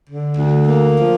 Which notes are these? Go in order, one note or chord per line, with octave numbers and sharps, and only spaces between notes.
D3
D2
A#3
F3